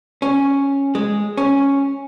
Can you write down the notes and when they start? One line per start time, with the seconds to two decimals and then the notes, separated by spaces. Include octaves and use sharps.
0.22 C#4
0.95 G#3
1.37 C#4